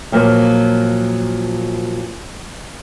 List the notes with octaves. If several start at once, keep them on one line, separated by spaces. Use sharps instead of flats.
A#2 F3 F#3 A#3